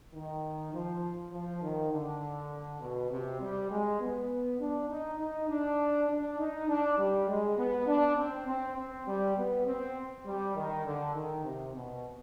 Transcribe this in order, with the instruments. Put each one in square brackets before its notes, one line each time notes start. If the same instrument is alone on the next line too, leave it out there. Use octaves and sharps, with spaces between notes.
[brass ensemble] D#3
F3
F3
D#3
D3
B2
C3
G3
G#3
B3
D4
D#4
D#4
D4
D4
D#4
D4
G3
G#3
B3
D4
C4
C4
C4
G3
B3
C4
G3
D#3
D3
D#3
C3
B2